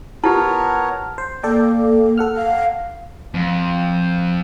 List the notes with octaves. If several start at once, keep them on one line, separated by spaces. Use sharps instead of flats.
B3 E4 F4 G4 A#4 C#5 A5
C5
A#3 A4 D5 G5
A4 F#5 F6
F5
F2